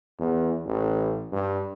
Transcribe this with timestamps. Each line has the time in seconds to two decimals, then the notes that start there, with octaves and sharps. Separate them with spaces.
0.19 E2
0.66 A1
1.32 G2